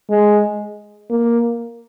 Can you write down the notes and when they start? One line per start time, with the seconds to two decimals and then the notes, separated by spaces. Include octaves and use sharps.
0.10 G#3
1.10 A#3